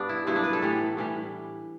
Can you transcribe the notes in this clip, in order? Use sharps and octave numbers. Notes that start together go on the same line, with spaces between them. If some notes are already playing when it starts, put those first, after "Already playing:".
Already playing: G2 B3 D4
E4
G2 F#3 B3 E4
D4
B4
A4
A2 E3 G3
A2 E3 G3